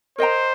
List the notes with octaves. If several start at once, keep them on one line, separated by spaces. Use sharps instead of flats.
A#4 C5 D#5 G5 A#5